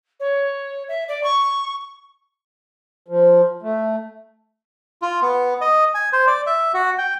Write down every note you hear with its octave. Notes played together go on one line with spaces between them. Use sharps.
C#5
E5
D5
C#6
F3
A3
F4
B3
D#5
G#5
C5
D5
E5
F#4
G5